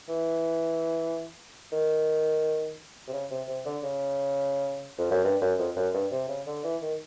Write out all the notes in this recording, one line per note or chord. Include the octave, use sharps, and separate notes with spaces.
E3
D#3
C3
C#3
C3
C3
D3
C#3
F2
F#2
G2
F#2
F2
F#2
G2
C3
C#3
D3
E3
D#3